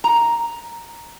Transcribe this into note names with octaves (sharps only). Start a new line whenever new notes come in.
A#5